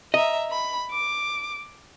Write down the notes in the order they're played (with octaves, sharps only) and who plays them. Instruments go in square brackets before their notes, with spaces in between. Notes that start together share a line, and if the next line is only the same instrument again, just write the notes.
[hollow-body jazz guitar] D#5 [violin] E5 A#5
[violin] B5
D6